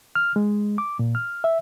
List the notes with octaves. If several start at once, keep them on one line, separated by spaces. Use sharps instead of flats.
F6
G#3
D6
A#2
F6
E5